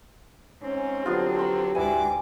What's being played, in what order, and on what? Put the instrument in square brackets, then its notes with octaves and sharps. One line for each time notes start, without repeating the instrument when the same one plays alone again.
[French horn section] G#2 C#4 [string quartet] C4
[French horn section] D3 F#3 [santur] F3 B3 F4 [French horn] G4
[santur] B5 C6
[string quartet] D2 G#2 D6 [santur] G3 G#5 [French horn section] E4 F#4 B4